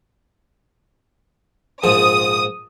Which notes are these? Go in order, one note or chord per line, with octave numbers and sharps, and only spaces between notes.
A#1 G#2 F3 D#6